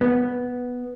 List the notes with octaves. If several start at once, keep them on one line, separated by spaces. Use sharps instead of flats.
B3